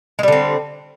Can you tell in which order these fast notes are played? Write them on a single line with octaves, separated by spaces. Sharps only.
G#3 G3 D3 C4